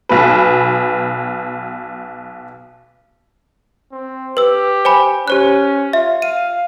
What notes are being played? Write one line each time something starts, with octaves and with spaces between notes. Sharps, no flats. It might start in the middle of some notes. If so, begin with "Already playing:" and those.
B1 B2 B4
C4
G4 B4 E6
C5 G#5 B5
C#4 G4 C5 F#6
F4 E5
F5 D#7